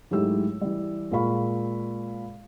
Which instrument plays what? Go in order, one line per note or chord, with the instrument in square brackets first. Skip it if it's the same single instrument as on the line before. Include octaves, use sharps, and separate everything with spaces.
[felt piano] G#2 F#3 A3 E4 G4 E6
E3 G3
A#2 G#3 F4 F5 B5 C#6